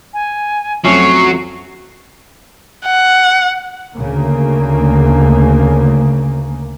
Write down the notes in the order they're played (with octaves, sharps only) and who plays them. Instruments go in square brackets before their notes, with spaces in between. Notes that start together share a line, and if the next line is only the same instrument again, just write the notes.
[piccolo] G#5
[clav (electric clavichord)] F2 A3 C#4 [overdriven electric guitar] F#3 [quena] C#6 [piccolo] C7
[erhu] F#5
[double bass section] D2 C#3 A#3